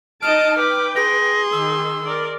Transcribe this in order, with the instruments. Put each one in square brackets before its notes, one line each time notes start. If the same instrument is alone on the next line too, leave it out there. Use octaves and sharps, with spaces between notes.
[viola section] D#4 D#5 A5 [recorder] F6 [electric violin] D7
[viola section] B4 G5 [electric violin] D6
[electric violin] G#4 C6 [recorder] A#6
[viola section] D#3 [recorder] E6
[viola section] A#4 D5